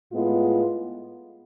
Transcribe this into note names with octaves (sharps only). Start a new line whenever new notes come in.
A2 G#3 B3 F4